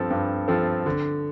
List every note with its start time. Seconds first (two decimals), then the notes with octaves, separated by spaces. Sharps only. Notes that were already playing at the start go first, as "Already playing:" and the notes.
Already playing: G2 F3 C4 A4
0.10 G2
0.48 F3 C4 A4
0.86 D3